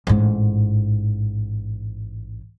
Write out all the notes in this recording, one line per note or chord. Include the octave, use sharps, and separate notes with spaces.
A1 G#2